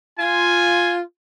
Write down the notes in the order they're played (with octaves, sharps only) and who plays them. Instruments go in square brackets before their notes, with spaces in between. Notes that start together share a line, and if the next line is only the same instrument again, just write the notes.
[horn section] F4 [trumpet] G#5